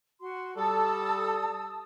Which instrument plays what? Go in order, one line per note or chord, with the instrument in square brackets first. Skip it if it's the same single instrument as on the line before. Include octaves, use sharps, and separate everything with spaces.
[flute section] F#4 C6
[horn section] G3 A4 [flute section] A5 D#6 E6